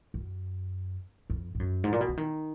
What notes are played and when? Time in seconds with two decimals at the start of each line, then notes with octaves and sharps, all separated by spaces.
0.14 F#2
1.30 F2
1.55 G#2
1.60 F#2
1.84 G#2
1.93 A#2
2.01 B2
2.09 D3
2.17 D#3